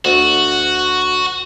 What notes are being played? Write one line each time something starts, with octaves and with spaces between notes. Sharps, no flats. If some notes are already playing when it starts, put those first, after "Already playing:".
D2 F#4